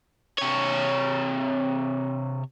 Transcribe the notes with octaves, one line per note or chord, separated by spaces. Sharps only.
C3 C#5